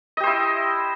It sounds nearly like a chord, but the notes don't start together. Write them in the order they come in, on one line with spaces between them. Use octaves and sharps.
D#5 G4 C5 E4